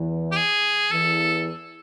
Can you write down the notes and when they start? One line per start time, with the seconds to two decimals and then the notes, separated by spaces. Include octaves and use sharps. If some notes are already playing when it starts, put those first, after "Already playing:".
Already playing: E2 E3
0.32 G4
0.37 G#4
0.92 E2 E3 A4